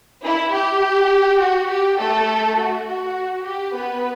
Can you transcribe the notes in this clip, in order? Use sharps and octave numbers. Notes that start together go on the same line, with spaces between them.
E4
G4
F#4
G4
A3 A4
F#4
F#4
G4
B3 B4